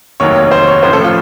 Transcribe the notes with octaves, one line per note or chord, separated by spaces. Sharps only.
F1 D#2 D#3 F#3 C#5
C#5
C5
C#5
A1 A2 F3 C5
A4
F4